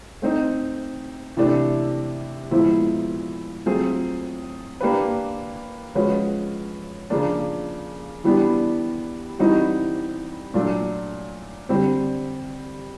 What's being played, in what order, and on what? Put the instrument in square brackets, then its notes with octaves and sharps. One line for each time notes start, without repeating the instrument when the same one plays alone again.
[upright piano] A3 C4 D#4
C3 E3 A3 D4
A#2 F3 G#3 B3 E4
F#3 A3 C4 F4 G#4
A#3 D4 G4 B4
F3 G#3 C#4 F#4 B4
C#3 F3 A#3 D4
E3 G3 B3 D4
E3 G3 C4 D#4 F#4
A#2 F#3 A3 D4
D3 G3 C4